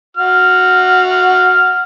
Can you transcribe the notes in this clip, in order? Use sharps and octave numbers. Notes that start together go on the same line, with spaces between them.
F#4 F6